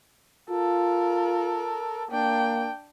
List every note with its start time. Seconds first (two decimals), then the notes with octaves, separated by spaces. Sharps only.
0.50 F4 A4 A#4
2.11 A#3 D4 G5